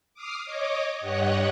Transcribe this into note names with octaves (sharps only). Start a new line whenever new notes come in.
D6 D#6 F6 C7
C#5 D#5 D6
G2 G4 C#5 D#5 F#5 F#6